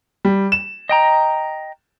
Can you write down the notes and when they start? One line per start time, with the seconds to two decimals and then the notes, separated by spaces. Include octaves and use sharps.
0.25 G3
0.52 E7
0.89 D#5 G5 A#5